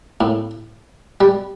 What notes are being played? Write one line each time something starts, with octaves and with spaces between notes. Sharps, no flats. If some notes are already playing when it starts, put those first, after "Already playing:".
A2
G3